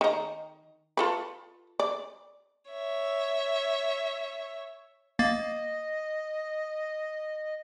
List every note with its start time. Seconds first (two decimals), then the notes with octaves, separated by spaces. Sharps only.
0.01 D#3 D#4
0.97 F4 A4 B4
1.80 D5
2.71 C#5 E5
5.19 A#3 D#5 A6